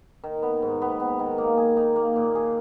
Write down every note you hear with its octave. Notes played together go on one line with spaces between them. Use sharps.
D#3
B3
G#2
B3
B3
D#3
A#3
G#4
D#4
A#3
A#2
G#4